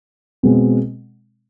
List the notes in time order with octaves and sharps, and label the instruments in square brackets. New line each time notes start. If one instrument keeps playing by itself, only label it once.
[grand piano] B2 G#3 C4